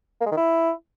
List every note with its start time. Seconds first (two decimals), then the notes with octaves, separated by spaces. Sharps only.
0.21 A#3
0.26 G#3
0.31 D#3
0.37 E4